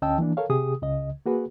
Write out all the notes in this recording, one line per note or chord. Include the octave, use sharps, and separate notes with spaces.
D2 C#4 D#5 G5 A5 E6
E3 A#3 D4
A4 A#4 C#5 F5
C3 G4 G#4 D#6
C#2 C#3 D#5
A#3 F#4 G#4 B4